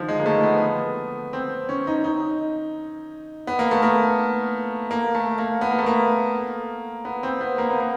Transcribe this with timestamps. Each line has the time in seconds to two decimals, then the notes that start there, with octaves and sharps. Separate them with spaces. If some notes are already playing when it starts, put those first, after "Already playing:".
Already playing: D3 D#3 F3
0.09 G#3
0.19 A#3
0.26 A3
0.43 B3
1.33 C4
1.69 C#4
1.87 D#4
2.04 D#4
3.47 B3
3.59 A#3
3.71 A3
3.83 A#3
4.91 A#3
5.15 A3
5.38 A#3
5.61 B3
5.70 A#3
5.79 A3
5.86 A#3
7.05 B3
7.23 C4
7.41 B3
7.58 A#3
7.70 B3
7.80 A#3